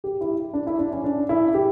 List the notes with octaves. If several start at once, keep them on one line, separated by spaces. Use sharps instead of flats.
G4
E4
D4
E4
D4
C#4
D4
E4
G4